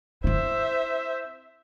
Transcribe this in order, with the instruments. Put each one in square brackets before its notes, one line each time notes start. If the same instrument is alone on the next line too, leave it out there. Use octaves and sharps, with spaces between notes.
[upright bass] C4 E4 [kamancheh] C5 E5